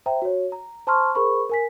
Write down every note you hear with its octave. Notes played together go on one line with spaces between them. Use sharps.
C5 E5 G5 A#5
F#4 C#5
A#5
C5 A5 A#5 C6 C#6 F6
G#4 A#4 C5 B5 C#6
A#4 G#5 B6